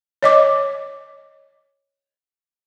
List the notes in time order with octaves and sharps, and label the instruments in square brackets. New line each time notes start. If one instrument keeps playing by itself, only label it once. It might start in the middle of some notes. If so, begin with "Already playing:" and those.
[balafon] C#5 D#5 D6